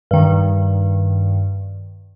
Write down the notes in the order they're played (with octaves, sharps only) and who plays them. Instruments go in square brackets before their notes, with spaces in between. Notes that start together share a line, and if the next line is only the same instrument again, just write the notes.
[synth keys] G2 D#3